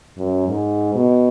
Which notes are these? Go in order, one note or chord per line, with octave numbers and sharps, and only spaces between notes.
F#2
G#2
B2